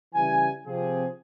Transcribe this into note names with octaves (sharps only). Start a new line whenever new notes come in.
C#3 E3 G3 G#5
C3 F3 C4 F4 G4 G#4